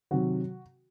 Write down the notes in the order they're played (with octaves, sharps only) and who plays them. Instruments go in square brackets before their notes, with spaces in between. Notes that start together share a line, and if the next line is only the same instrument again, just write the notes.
[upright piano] C3 D#3 F#3 F#4